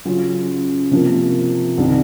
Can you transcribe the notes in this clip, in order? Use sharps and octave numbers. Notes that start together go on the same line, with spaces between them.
C#3 F#3 C#4 F4
C3 F3 A#3
C2 C3 D#3